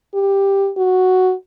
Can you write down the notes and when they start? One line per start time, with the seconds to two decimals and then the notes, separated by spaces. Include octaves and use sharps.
0.14 G4
0.77 F#4